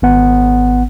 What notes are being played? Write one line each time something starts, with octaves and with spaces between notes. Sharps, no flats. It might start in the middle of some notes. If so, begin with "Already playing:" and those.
G#1 B3 F#5